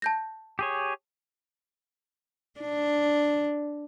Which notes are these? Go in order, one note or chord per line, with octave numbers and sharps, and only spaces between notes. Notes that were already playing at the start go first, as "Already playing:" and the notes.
A5 G6 A#6
G4 G#4 C#5
D4